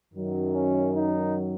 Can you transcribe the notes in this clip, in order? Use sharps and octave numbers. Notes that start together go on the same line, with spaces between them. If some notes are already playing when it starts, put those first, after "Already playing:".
F#2 D#3 F#3
C#4
D#4